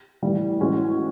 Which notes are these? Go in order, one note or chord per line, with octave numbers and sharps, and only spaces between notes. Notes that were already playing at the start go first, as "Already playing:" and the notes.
A2 E3 G3
A2 E3 G#3 C#4 F#4